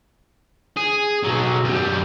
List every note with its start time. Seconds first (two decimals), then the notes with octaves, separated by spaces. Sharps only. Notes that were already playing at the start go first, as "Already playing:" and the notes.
0.76 G#4
1.24 B1 F#3
1.65 F#2 G3